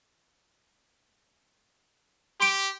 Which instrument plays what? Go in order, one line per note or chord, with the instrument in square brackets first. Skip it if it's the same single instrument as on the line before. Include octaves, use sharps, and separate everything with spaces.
[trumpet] G4 [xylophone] C6 D7